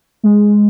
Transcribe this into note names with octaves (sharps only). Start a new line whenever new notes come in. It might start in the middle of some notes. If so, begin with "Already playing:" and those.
G#3